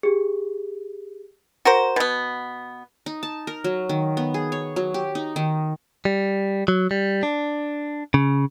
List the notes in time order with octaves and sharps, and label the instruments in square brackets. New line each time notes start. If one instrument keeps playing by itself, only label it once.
[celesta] G4 G#4
[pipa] F#4 A#4 C5
B2 B3
[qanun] D#4
A5
A#4
F#3
D#3
B3
G#4
C#5
F#3
G4
D#4
D#3
[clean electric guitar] G3
F#3
G3
D4
C#3